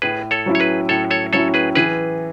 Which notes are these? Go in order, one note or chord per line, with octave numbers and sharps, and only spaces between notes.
A2 G#4 B4
A4 C#5
F#3 C#4 E4
C#5
G#4 B4
A2 A4 C#5
A4 C#5
F#3 C#4 E4 A4 C#5
G#4 B4
E3 G#4 B4